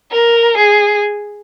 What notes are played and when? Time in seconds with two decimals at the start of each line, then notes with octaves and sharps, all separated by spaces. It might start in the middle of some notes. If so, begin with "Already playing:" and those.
0.12 A#4
0.57 G#4